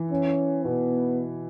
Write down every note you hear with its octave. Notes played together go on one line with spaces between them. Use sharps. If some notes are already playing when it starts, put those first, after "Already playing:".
Already playing: E3
C#4
B2 B3